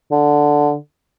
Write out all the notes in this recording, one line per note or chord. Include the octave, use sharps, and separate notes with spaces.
D3